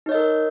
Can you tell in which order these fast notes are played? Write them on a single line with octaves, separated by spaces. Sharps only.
D#4 C#5 D#5 A#4